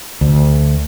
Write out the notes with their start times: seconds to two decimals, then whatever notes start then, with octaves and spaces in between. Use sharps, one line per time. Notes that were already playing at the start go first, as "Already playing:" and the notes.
0.21 D2